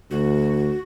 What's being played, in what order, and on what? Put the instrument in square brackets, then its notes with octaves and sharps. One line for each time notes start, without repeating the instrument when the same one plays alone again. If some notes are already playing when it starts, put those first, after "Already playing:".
[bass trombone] D2 [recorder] F#4